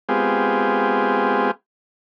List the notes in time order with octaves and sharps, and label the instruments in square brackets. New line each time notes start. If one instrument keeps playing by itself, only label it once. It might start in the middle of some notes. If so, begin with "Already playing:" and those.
[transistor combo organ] G#3 B3 C4 F4 G4 G#4